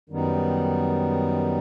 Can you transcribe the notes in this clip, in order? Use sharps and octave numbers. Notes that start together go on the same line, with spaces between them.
F#2 D#3 G3 B3 D#4